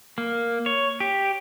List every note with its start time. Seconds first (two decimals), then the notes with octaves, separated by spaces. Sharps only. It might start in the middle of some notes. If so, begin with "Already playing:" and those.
0.18 A#3
0.66 C#5
1.00 G4